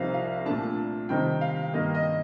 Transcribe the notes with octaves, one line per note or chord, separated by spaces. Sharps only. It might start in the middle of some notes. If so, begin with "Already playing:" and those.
Already playing: C2 C3 F3 C4 D#4 F5
F5
A#2 A3 D4 A5
C3 D#3 G3 C4 D#4 G5
F5
G2 D#3 A#3 D#5
D#5